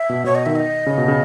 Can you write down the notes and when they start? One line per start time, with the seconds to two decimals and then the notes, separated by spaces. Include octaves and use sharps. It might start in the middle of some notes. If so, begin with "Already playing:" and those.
Already playing: E5
0.09 B2
0.24 B2 C#5
0.35 D#5
0.46 D#3 E5
0.55 D#5
0.87 C#3
0.98 B2
1.08 C#3